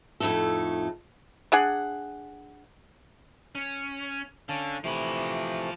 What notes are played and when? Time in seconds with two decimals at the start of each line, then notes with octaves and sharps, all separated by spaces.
0.20 F2 A2 A3 D#4 A4
1.52 D4 G#4 F#5
3.55 C#4
4.49 D3 C#4 F5 A5
4.84 C3 E3 F3 A3 B5